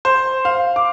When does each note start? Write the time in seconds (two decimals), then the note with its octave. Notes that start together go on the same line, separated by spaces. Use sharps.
0.05 C5
0.45 F5
0.76 D6